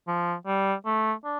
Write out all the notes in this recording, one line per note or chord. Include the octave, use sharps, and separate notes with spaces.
F3
G3
A3
D4